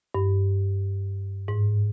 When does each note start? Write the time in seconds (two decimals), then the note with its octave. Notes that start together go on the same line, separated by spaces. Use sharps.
0.15 G2
1.48 G#2